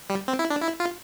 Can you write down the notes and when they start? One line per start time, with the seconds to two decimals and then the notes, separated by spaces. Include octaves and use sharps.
0.10 G3
0.28 C4
0.39 E4
0.50 D4
0.62 E4
0.80 F4